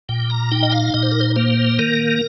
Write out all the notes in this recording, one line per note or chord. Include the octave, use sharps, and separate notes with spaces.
A#2 G5
A#5
D#4 G5
D#5
F5
A#2 D#5
C5
A#4
C5
A#3 C5
D#3 A#4